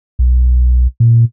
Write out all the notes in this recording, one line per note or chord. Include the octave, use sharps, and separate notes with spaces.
B1
A#2